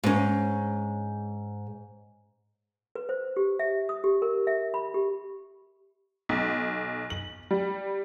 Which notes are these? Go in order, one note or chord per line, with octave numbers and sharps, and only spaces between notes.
G#2 C#4
B4
C5
G4
E5
D#6
G4
A#4
E5
B5
G4
B1
F#7
G3